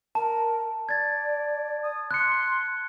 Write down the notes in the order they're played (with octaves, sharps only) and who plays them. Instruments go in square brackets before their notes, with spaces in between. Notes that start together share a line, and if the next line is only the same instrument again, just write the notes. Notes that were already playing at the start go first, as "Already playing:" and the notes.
[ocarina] A#4 [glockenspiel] A5
[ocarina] D5 [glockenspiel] G#6 A6
[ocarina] D#6
[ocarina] C6 [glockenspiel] F#6 C#7